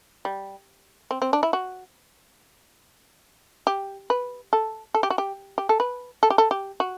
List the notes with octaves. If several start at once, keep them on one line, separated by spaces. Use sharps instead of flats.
G3
C4
C4
D4
E4
F#4
G4
B4
A4
A4
G4
F#4
G4
G4
A4
B4
A4
G4
A4
G4
F#4